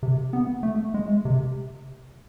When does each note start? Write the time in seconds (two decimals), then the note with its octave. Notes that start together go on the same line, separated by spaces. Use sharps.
0.03 C3
0.33 B3
0.63 A3
0.94 G#3
1.25 C3